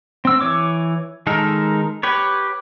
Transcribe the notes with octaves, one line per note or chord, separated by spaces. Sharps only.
C4 E6
E3 C#5 D6
D#3 G#3 D#4 A4 A#4
G4 B4 C#5